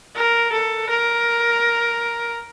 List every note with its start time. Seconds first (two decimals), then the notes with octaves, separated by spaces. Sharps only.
0.16 A#4
0.53 A4
0.90 A#4